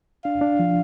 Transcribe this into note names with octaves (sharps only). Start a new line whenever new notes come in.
D4 F5
D4
F3